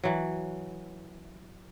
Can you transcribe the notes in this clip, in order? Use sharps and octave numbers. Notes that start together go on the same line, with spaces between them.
E3 F#3